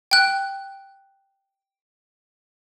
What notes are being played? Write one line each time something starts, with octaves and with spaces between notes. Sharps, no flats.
G5 F#6